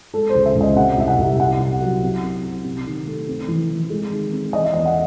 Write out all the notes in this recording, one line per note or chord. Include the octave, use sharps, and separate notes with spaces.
G#3 A4
C5
C#2
E5
C#2
D#5
C3 F#5
C2 E5
F#5
C2
C3 F#5
C3
F#3
C4
C4
C4
C3
D#3
A3
C4
E3
E3
G#3
D#3
C4
E3 D#5
E5
E2 D#5
F#5